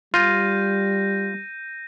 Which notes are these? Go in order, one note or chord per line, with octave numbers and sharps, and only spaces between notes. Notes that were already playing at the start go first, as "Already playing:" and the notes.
G3 F4 G6 A#6 D#7